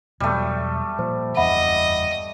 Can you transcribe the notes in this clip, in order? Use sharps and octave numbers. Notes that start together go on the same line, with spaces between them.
E2 B2 F#3 G3 A3
A#2 F3 C5
F#1 E2 G2 D#5 E5 F#5 B5